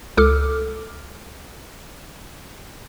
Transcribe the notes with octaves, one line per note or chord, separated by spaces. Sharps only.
C#2 A4 D6 F6